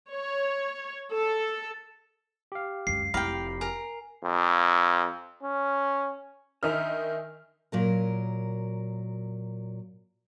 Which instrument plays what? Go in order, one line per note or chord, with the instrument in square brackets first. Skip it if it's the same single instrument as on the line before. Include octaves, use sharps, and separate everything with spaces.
[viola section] C#5
A4
[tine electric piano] G4 F5
[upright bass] C#2 F#2 [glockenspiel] C7
[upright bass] F1 E4 [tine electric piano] G4 A#5 B5 [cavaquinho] F5 G5
[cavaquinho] A#4 [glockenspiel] G#5
[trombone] F2
C#4
[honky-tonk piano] D#3 D#4 F6 [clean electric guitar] A#4 E5 G#5
[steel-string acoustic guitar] A#2 F#3 A#4